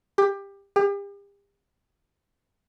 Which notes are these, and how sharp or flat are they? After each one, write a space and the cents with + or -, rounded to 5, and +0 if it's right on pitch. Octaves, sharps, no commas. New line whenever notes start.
G4 +20
G4 +40